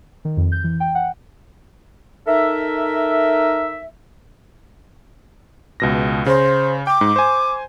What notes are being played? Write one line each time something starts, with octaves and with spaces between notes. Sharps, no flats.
D#3
F2
G6
E3
G5
F#5
D#4 A4 A#4 E5
C#2 B2 A#6
C#3 C5
G5 D6
G#2
C5 G#5